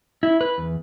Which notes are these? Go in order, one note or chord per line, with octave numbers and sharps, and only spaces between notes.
E4
B4
E2